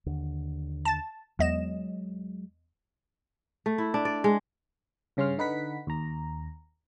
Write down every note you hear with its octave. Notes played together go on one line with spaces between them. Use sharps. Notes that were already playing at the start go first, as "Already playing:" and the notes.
D#2 D3
A5 A6
E2 F#3 G#3 D#5 E7
A3
E4
D4
D5
G#3
G2 C#3 C#4 C6 F6
D3 D#4 B4 F#5 B6
D#2 A#5